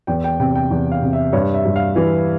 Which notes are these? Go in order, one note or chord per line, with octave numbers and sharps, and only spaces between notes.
E2 G5
G5
C3 G5
G5
E2
F5
C3
E5
G2 C#5
E5
G2
F5
E3